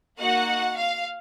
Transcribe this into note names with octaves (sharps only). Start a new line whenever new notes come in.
A#3 D#4 F#4 F#5
F5